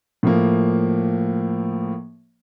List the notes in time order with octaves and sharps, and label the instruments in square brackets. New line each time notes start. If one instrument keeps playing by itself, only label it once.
[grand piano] A2 F3 A#3